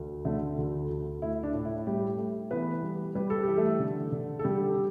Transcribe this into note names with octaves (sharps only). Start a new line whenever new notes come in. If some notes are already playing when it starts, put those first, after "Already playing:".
Already playing: D2
D3 A3 A4
D2
D2
A3 E4
D4
A2
E4
G3 A3 G4
A3
E3 B3 B4
G3
G3 B4
A4
E3 G4
A3 A4
D3
D3
A4
D3 G3 G4